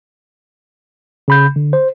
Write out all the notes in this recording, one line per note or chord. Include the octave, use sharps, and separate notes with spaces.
C#3 B5 G6
D3
C5